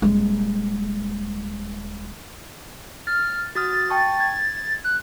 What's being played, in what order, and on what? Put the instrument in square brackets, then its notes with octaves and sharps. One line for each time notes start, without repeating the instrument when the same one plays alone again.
[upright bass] D#1 G#3
[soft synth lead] F6 [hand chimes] A6
[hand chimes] F#4 D#6 F6 [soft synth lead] A6
[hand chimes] G5 A5 C#6
G#6
[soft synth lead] F#6